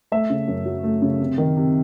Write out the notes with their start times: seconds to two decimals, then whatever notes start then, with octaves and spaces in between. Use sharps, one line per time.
0.12 A3 E5
0.30 C#3
0.48 F#2
0.66 F#3
0.83 A3
1.02 C#3
1.20 C3
1.38 D#3
1.56 C3